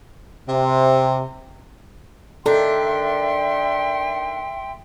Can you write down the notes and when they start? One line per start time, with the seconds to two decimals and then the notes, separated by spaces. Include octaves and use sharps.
0.49 C3
2.46 D#3 D4 A4 E5 G5 C6